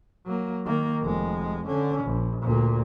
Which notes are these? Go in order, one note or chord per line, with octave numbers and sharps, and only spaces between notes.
F#3 A#3
D#3 A#3
F1 G#3
D3 C#4
A#1
D2 A#2